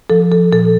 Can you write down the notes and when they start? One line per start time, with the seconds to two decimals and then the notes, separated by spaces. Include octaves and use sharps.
0.10 F3 A4
0.32 A4
0.52 A#2 A4